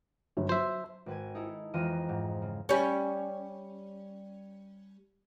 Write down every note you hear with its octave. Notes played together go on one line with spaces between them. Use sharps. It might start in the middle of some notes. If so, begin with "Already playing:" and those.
G1 G2 F#3
F#3 C5 E5
G#1 B4 G#5
D#4 E4 A4
F2 E3 G#3 F4 A#5 D#7
G#2
C#3
G3 C#4